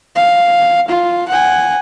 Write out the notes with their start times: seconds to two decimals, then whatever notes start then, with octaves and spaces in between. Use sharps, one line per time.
0.15 F5
0.88 F4
1.28 F#5 G#5